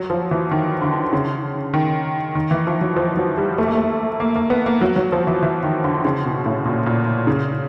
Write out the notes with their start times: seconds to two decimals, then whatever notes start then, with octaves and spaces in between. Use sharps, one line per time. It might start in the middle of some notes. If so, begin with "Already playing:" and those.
Already playing: F#3
0.10 F3
0.31 E3
0.51 D#3
0.81 D3
1.13 C#3
1.74 D#3
2.35 D#3
2.51 E3
2.67 F3
2.81 F#3
2.96 F3
3.17 F#3
3.38 G3
3.58 A3
3.67 A#3
3.77 A3
4.20 A#3
4.36 A#3
4.50 B3
4.66 A#3
4.81 F#3
4.96 F#3
5.12 F3
5.27 E3
5.43 E3
5.63 D#3
5.84 D3
6.05 C#3
6.25 B2
6.46 A2
6.66 A#2
6.86 A#2
7.27 C#3